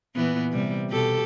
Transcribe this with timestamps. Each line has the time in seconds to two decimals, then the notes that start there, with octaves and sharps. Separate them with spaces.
0.16 A#2 E3 B3
0.52 C3 G3
0.89 B2 G4 A4